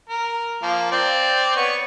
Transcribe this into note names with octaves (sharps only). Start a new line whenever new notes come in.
A#4
F3 A#3
C4 D5
B3 C#5 C#6